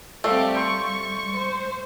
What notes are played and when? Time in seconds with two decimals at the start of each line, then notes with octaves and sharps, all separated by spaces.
0.24 G3 A3 C4 G4 A4 D5 F5
0.55 C6 C#6 G6
1.36 C5